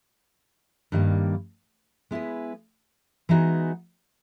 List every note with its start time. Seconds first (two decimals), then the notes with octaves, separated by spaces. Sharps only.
0.92 G2 D#3 G3 A#3
2.11 G#3 B3 E4 G#4 B4
3.29 E3 G#3 B3 D#4 F#4